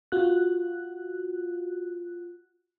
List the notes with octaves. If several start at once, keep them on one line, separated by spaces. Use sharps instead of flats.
F4 F#4 F#6